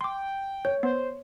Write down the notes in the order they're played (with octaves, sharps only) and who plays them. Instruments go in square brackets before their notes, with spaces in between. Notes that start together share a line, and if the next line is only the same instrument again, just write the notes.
[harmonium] G5 [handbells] C6 D6
[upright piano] C#5 [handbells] G6
[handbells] B3 [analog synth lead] C5